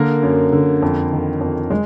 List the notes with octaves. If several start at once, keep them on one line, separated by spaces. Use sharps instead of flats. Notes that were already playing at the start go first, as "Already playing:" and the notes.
Already playing: D3 A#3 A#4
F#2
D3
F2
D#3
F2
G#3